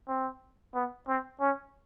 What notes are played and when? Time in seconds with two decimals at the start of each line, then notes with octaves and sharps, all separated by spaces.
0.08 C4
0.75 B3
1.08 C4
1.41 C#4